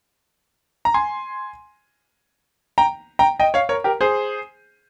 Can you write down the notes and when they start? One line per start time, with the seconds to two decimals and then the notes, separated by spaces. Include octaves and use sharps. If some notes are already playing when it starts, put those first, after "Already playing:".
0.85 A#5
0.94 G#5 C6
2.78 G5 A#5
3.19 G5 A#5
3.39 D#5 G5
3.54 C#5 F5
3.69 A#4 C#5
3.84 G4 A#4
4.01 G#4 C5